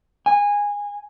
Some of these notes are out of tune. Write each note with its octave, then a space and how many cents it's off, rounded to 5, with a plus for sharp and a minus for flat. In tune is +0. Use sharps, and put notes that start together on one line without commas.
G#5 -20